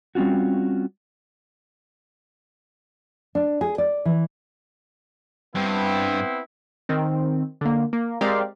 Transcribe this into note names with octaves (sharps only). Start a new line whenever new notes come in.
G3 C4 C#4 F4 F#4
D4
G#4
D5
E3
G2 B3 C4 E4
D#3 C4
D3 A#3
A#3
G#3 C4 G4 A#4 D5 F5